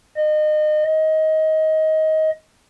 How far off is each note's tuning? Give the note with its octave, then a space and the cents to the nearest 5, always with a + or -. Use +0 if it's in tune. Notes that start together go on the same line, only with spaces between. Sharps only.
D#5 -30
D#5 +20